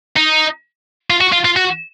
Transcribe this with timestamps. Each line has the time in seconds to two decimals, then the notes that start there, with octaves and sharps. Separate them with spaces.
0.16 D#4
1.10 F4
1.21 F#4
1.32 F4
1.45 F4
1.56 F#4